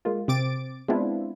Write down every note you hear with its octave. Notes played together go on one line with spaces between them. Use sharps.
G#3 A#3 F4
C3 C4 D6 A6 D7
G#3 B3 C4 D4 E4 F4